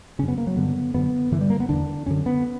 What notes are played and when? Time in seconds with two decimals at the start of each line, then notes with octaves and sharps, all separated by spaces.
0.19 C#3 C#4
0.23 F#2
0.28 B3
0.38 A#3
0.47 F#3
0.56 G2 D3 B3
0.94 F#2 D3 B3
1.31 G2 D3 E3
1.41 G3
1.50 A#3
1.60 B3
1.69 E2 D3 D4
2.06 F#2 D3 C#4
2.26 B3